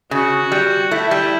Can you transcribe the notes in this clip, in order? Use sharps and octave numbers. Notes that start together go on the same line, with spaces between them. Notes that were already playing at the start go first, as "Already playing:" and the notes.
C#3 F#4
G3
A3 E4
G3